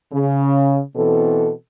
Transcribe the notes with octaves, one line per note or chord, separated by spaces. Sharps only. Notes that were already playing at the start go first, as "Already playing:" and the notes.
C#3
B2 E3 C4 A4